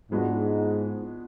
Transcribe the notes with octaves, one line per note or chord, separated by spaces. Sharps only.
G#2 F3 G#3 B3 D4 F#4